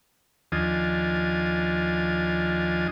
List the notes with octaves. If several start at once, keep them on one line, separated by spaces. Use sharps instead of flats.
D#2 F3 D4 F4 D#5 G#5